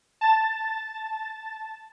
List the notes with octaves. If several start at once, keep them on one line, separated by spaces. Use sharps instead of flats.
A5 A6